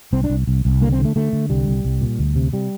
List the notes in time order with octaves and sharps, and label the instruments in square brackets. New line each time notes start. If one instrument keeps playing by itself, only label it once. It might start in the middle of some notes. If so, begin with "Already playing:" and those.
[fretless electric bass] C2 C4
D4
C2
C2
C2
D3 A#3
C4
D3
A3
D3 A3
D3
C2 G3
C2
C2
A#2
D2
C3
C3 G3